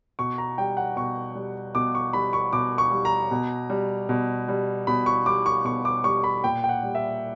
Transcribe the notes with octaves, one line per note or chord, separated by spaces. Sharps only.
B2 C#6
A#5
G3 G5
F#5
B2 C#6
G3
B2 D6
C#6
G3 B5
C#6
B2 D6
C#6
G3
A#5
B2
G3
B2
G3
B2 B5
C#6
G3 D6
C#6
B2 C#6
D6
G3 C#6
B5
A#2 G5
G5
F#5
G3
E5